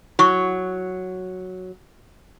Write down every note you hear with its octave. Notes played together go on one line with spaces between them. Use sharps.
F#3 E4 C#6